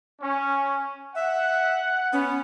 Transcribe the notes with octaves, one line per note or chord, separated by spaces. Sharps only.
C#4
E5 F#5
B3 C#4